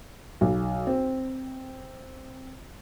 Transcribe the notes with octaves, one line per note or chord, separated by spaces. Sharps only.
B1
C4